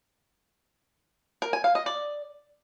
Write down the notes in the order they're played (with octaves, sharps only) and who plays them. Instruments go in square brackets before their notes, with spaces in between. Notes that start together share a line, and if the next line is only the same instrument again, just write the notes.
[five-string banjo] A#4
G#5
F5
D#5
D5